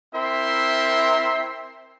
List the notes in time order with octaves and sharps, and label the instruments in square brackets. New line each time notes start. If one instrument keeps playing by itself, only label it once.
[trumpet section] C4 E4 A#4 E5 C6